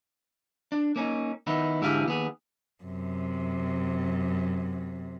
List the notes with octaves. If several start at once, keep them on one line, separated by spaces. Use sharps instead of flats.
D4
A#3 C#4 D#4
D#3 B3 D#4 E4
G#2 D3 E4 G4 G#4 F5
D#2 B3 G#4
F#2 C3